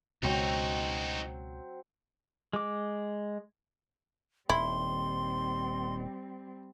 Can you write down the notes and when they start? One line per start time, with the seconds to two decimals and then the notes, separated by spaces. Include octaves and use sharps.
0.23 C#2 B2 F#3 C4 D#4 F#4 C5
2.53 G#3 D6
4.49 D#1 D#3 G3 C4 E4 C6